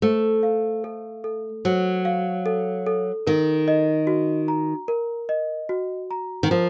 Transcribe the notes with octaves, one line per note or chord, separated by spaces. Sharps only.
A3 C5
F5
A4
A4
F#3 C5
F5
A4
A4
D#3 A#4
D#5
F#4
A#5
A#4
D#5
F#4
A#5
D#3
F3 A#4